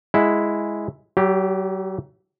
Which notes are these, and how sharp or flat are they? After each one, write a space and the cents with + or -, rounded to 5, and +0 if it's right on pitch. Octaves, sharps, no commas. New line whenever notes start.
G#3 +0 E4 +0 F#5 +0
F#3 +35 G4 +0